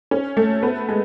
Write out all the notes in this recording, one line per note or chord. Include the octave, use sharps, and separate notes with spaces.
C#4
A3
B3
G#3